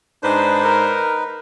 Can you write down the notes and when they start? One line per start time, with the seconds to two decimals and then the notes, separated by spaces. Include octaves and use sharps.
0.23 G#2 D4 D#4 B4 C5
0.64 A#4